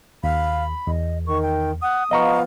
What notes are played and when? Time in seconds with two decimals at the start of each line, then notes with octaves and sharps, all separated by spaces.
0.24 D#2 F5 B5
0.87 E2 D#5
1.27 D#3 C#6
1.42 G5
1.82 F#5 D#6
2.11 F3 B3 D#5 F5 A#5 C#6